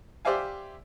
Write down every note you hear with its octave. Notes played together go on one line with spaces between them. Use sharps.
G4 C5 D5 E5 F5 G#5